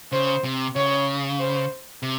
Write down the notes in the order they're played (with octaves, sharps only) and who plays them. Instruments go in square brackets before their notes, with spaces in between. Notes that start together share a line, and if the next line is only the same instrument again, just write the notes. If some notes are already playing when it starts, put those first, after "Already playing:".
[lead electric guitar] C#3 [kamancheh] C5
[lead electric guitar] C3
[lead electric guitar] C#3 [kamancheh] C#5
[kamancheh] C5
[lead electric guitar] C3